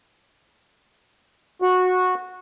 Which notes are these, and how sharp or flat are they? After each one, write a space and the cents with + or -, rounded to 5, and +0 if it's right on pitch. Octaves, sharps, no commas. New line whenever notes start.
F#4 -15